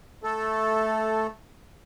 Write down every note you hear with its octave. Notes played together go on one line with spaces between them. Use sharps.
A3 A4